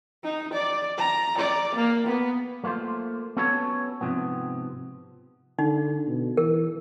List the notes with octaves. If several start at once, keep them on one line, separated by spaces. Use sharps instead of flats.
D#4
D5
A#5
D5
A#3
B3
A3 A#3 F4 C5
B3 C#4 F#4 A4 B4 C#5
G#2 C3 F3 B3
D3 D#4
B2
E3 A#4